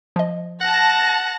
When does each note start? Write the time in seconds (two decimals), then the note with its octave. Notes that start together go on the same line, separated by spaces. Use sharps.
0.16 F3 D#5
0.61 F#5 A5 A#6